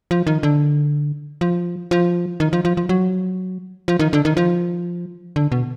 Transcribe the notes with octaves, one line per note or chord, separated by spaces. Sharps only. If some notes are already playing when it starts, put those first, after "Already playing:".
F3
D#3
D3
F3
F3
D#3
F3
F3
F3
F#3
F3
D#3
D3
D#3
F3
D3
B2